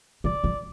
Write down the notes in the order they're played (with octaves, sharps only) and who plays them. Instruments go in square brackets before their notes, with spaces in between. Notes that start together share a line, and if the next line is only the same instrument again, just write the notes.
[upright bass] F3 [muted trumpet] D5
[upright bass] F3